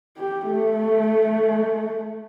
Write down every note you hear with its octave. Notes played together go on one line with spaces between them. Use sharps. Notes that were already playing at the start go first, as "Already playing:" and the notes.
G4
A3